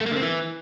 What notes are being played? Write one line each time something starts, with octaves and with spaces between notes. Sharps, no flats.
A3
A#3
D3
C4
E3